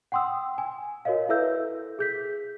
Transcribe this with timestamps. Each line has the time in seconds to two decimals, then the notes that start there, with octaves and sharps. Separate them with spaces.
0.12 F#5 G5 C6 D#6 E6
0.58 G#5
1.05 F#4 A#4 C#5 D#5 F5
1.29 E4 A4 B4 E5 E6 G6
1.99 G#4 G6 B6